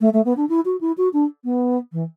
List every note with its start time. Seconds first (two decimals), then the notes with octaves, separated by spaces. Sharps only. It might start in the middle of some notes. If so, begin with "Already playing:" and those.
0.01 A3
0.13 A3
0.25 B3
0.37 D4
0.49 E4
0.65 F#4
0.81 E4
0.98 F#4
1.13 D4
1.44 B3
1.93 E3